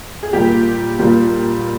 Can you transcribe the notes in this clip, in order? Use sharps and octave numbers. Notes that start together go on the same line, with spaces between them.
G#4
A#2 G3 A#3 G4
A#2 G3 A#3